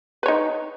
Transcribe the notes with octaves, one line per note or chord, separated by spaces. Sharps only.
D#4 B4 C#5